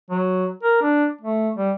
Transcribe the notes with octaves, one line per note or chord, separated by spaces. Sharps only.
F#3
A#4
D4
A3
G3